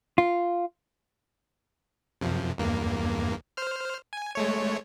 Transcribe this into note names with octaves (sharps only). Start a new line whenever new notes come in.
F4
F#2 C3 F3
E2 G2 A#3
C5 F6
G#5
G#3 A3 C#5